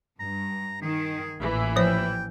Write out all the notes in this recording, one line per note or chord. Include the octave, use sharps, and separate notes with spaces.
G2 A#5
D#3 G#4
A1 A#2 E3
F3 C5 G5